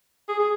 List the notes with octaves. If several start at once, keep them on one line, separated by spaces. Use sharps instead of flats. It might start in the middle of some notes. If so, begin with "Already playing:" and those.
G#4
G#4